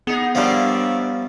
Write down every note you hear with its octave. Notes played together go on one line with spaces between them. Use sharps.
B3 D#4 G#4
F3 G3 A#3 D4 C5 C#5 E5 F5